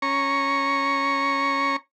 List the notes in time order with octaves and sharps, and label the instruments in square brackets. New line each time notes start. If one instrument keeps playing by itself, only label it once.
[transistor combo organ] C#4 A#5 C#6